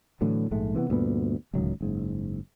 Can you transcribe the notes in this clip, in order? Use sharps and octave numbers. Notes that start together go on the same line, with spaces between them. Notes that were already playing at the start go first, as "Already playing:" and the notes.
A2 D3 E3 F#3
A#1 G#2 G#3 A3
C3 E3 A3 B3
D2 G2 A#2 B3
D1 C#2 D#3 F#3
F#1 G#2